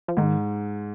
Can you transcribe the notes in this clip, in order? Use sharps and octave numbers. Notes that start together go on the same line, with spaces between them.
F3
G#2 D#3